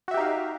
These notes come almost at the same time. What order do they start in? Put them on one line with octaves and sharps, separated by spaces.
F#4 E5 G4 D#4 F5